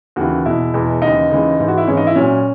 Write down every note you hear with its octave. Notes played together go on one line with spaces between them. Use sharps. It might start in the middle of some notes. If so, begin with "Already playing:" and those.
D#2 C#3 E3 F#4
E2 B2 G#3 E4
E2 B2 G#3
D#2 C#3 E3 G#3 D#4
D#2 C#3 E3 G#3
G#2 E3 G#3
F#4
E4
G#2 E3 G#3 C#4
D#4
E4
A#2 F#3 C#4